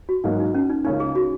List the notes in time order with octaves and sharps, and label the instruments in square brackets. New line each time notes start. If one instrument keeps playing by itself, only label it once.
[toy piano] F#4
[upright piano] G#2 F#3 A#3 F#4 [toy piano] D#4
[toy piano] D#4
C#4
D#4
[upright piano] C#2 C#3 A#3 C#4 [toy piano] D#4
[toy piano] G#4
F#4